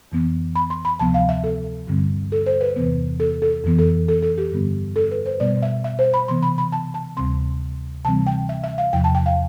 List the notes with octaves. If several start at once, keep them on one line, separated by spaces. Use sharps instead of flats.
F2 E3 B3
B5
C6
B5
D2 C3 F3 B3 A5
F5
E5
A4
G2 D3 G3 C4
A4
C5
B4
E2 C3 E3 B3
A4
A4
F2 E3 B3
A4
A4
A4
G4
G2 D3 G3 B3
A4
B4
C5
B2 G3 B3 D5
E5
E5
C5
B5
C3 E3 B3 C6
B5
B5
A5
A5
D2 C3 G3 C4 C6
C3 E3 G3 C4 A5
G5
E5
E5
F5
E2 C3 F3 G5
A5
G5
F5